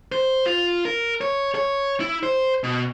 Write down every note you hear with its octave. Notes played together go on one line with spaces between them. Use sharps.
C5
F4
A#4
C#5
C#5
E4
C5
B2